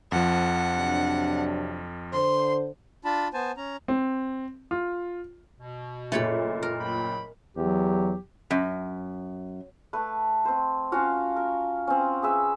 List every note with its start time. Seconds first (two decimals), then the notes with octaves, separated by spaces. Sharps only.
0.12 F2 F3 F#5
0.75 C3 F#3 D4
2.13 D3 C5 C6
3.05 D4 F4 A5 B5
3.34 B3 C5 G#5 A5
3.57 C#4 A#5
3.88 C4
4.71 F4
5.58 B2
6.12 F#1 A#2 A3 C#5 B5
6.63 A#4
6.80 F#3 G5 B5
7.57 E2 F#3 G4
8.51 F#2
9.93 A3 B4
10.45 C4 C5
10.92 C#4 F4 F#4 F5
11.36 A#4
11.87 C4 C#4
12.22 G#4 B4 E5